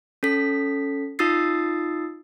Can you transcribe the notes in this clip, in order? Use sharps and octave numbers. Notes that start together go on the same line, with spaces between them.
C#4 A4 B6
D#4 F4 D#6 E6 A6 C7